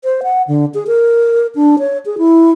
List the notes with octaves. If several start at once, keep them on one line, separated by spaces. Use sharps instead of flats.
C5
F#5
D3
G#4
A#4
D4
C#5
G#4
E4